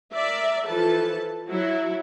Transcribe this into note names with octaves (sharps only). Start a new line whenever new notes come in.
A#4 D5 E5
E3 F3 A4 B4 A5
F#3 E4 F#4